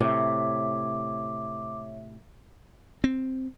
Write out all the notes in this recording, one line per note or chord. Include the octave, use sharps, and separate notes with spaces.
A2 C3 C#5 E5 D6
C4